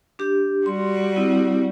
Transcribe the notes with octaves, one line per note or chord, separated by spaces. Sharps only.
D4 G4
G3 F#4 C6
C4 E4